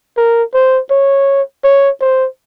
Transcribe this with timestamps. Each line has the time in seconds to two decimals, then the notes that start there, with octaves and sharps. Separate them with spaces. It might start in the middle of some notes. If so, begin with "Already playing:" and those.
0.17 A#4
0.54 C5
0.90 C#5
1.64 C#5
2.01 C5